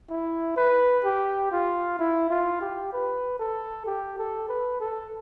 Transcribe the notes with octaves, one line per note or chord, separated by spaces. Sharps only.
E4
B4
G4
F4
E4
F4
G4
B4
A4
G4
A4
B4
A4